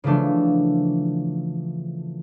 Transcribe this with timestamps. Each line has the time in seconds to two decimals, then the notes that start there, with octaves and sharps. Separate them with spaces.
0.04 C#3 E3 F3 A3 D4